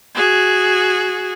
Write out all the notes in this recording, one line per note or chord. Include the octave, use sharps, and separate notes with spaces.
F#4 G#4